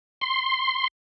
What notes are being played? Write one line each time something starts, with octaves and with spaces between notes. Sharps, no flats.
C6